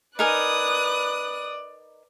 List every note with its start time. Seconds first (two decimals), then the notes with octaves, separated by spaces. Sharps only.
0.19 D#4 A#4 B4 D5 G#5 D#6 F#6